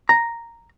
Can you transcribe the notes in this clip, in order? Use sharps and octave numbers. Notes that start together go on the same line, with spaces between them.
A#5